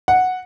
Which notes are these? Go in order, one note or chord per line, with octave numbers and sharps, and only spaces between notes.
F#5